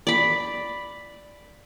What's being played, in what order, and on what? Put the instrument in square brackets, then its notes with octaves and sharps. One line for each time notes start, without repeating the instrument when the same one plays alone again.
[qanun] D5 B5